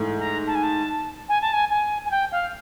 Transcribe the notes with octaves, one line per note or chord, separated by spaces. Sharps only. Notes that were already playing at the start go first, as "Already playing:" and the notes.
Already playing: G#2 E3 A3
A#5
A5
G#5
A5
G#5
A5
G#5
G#5
G#5
G5
F5